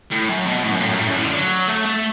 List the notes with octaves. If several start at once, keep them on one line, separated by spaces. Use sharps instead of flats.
A2
F#2
B2
A2
F#2
A2
F#2
A2
F#2
A2
D3
F#3
A3
A3